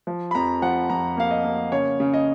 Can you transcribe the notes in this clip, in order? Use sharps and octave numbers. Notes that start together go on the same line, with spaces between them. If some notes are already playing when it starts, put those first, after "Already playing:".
F3
B5
F2 A#5
F3 F#5
F2 A#5
A#3 F5
D#5
A#3
C#3 C#5
C#3
D#5